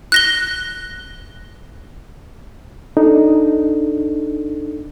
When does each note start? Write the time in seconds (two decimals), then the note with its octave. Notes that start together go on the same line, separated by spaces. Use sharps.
0.12 F#6 A#6 G7
2.97 D4 D#4 A4